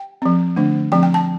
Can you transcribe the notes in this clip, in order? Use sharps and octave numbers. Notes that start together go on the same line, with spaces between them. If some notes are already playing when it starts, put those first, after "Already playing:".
Already playing: G5
F3 C4
D3 A3 D4
F3 C4 G5
G5
A5